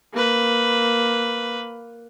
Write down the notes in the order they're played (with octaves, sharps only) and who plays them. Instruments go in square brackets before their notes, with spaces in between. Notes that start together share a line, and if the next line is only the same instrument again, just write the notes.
[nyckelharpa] A#3 B4